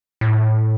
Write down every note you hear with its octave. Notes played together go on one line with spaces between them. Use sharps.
A2